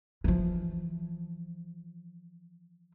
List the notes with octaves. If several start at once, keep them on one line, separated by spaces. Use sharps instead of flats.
E3 F3